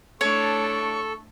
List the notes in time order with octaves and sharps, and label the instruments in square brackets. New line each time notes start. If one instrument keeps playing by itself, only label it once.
[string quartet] A3 D4 E4 [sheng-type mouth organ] A4 [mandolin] C#5 [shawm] C#6